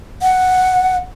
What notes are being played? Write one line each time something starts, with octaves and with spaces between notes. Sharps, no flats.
F#5